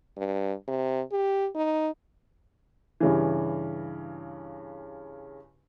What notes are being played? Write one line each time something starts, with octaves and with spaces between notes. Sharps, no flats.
G2
C3
G4
D#4
G2 C#3 E3